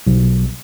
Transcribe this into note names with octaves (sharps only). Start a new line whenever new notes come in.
B1